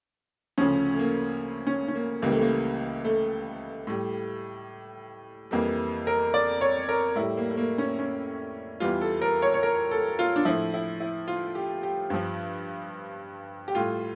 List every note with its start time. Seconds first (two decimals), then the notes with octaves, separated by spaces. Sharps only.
0.58 D2 C#3 F3 C#4
0.93 A3
0.99 A#3
1.67 C#4
1.88 C#4
1.95 A#3
2.22 C#2 C#3 E3 G3 A#3
2.32 A3
2.41 A#3
3.04 A3
3.87 A2 G3
5.51 F2 E3 G3 A#3
6.07 A#4
6.34 D5
6.61 C#5
6.89 A#4
7.16 A2 G3 E4
7.37 A#3
7.51 A3
7.57 A#3
7.78 C#4
7.99 C#4
8.80 E2 E3 G3 F4
9.01 A4
9.22 A#4
9.42 C#5
9.54 C#5
9.63 A#4
9.91 A4
10.19 F4
10.36 D4
10.45 A2 F3 E4
10.74 E4
11.00 E4
11.28 F4
11.55 G4
11.83 G4
12.10 G2 F3
13.68 G4
13.75 A2 G3 F4